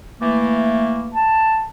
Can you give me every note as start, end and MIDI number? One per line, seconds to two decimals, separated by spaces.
0.22 1.18 52
0.22 1.18 57
0.22 1.18 58
1.14 1.66 81